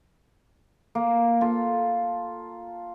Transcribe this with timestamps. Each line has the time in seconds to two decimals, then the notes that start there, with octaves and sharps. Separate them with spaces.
0.95 A#3
1.41 F4 A4